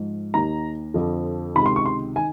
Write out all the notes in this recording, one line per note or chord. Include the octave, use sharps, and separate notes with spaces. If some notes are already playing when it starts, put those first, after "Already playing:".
Already playing: G#2 F3
D#2 D#3 A#5
F2 D3 F3
C#2 C3 D#3 B5
C6
C#6
C6
D#3 G#5